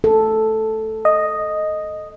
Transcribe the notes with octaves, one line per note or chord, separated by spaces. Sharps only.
A4
D#5